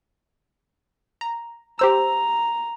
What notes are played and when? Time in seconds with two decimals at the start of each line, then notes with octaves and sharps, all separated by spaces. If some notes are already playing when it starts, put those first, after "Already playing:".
1.21 A#5
1.79 G4 C5 A#5 E6